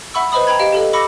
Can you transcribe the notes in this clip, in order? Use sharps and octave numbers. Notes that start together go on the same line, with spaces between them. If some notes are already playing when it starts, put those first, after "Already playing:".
E5 F#5 B5 C#6 E6
B4 C5 D#5 B5 D#6
G5 A#5 B5 G#6
G4 D#5 F5 D7
G4 A4 D#5
B5 C#6 D6 E6 A#6 C#7